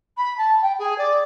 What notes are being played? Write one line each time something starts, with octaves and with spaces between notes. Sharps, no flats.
B5
A5
G5
G#4
D5